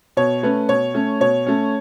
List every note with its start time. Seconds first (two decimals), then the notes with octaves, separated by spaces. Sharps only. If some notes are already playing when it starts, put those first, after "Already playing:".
0.17 B2 C#5
0.43 A3 C#4 B4
0.68 B2 C#5
0.94 A3 C#4
1.20 B2 C#5
1.47 A3 C#4